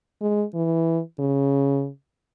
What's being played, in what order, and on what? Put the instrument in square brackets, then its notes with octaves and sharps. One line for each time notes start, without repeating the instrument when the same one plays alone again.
[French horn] G#3
E3
C#3